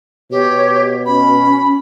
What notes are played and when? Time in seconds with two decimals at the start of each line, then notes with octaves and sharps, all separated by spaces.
0.31 B2 G4 C#5
1.06 C#4 B5